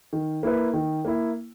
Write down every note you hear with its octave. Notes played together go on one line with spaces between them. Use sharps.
D#3
A#3 E4 B4
D#3
A#3 E4